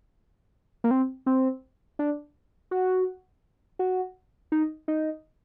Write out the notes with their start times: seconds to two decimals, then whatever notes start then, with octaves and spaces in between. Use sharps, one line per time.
0.84 A#3
0.91 C4
1.26 C4
1.99 D4
2.71 F#4
3.79 F#4
4.52 D#4
4.88 D#4